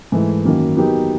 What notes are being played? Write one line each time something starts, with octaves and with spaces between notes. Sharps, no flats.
G#2 E3 A3
F#2 D#3 F#3 A#3
F#3 B3 D#4 G4 A#4